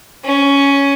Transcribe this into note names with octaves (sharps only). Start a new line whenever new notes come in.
C#4